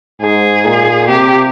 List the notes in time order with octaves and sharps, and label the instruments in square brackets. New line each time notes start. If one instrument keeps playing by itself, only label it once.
[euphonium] G#2 [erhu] G#4
[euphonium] A#2
[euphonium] C3 [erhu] G4